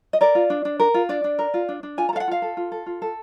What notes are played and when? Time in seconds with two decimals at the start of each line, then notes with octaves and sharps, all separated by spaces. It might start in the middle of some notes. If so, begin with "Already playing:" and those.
0.13 D#5
0.21 A#4 D5
0.35 F4
0.50 D4
0.65 D4
0.80 A#4
0.94 F4
1.09 D4 D5
1.24 D4
1.39 A#4
1.54 F4
1.69 D4
1.83 D4
1.98 F4 G#5
2.09 A#5
2.13 A4 F5
2.20 F#5
2.28 F4 F5
2.42 A4
2.57 F4
2.72 A4
2.86 F4
3.02 A4